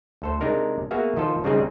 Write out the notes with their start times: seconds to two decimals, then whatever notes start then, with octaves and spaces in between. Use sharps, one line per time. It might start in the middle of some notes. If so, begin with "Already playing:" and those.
0.22 D2 A4 C5
0.41 C3 G#3 D4 D#4 A#4
0.91 A#3 B3 F#4 G#4 E5 F5
1.16 D#3 F3 F4 A4 C5
1.44 C#3 G3 G#3 C4 D#4 G#4